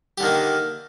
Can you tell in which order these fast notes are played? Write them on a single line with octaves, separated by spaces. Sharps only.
G4 D3 D#3 A#3